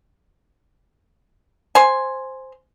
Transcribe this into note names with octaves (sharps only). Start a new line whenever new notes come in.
C5 G#5